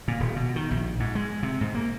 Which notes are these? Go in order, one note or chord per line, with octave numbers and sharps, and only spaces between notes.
A#2
D#1
B2
D#3
A#1
G#2
G#3
C3
G#2
A#3